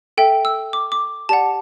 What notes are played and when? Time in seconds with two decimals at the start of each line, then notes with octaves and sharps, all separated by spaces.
0.18 A4 E5 G5
0.45 E6
0.73 D6
0.92 D6
1.29 G4 D5 F#5 A5